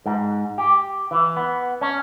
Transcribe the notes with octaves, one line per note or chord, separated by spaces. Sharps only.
G#2
G4
E3
B3
C#4